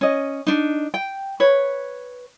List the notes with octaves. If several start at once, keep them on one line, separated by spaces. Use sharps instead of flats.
C#4 D#5
D4 D#4
G5
B4 C#5